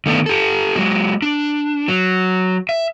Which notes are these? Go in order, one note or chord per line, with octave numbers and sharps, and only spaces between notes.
D#3 A3 B3 D4
G4 A4
F#3 G#3
D4
F#3
E5